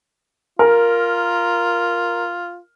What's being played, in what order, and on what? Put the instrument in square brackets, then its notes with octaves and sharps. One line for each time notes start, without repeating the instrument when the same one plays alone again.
[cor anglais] F4 [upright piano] A#4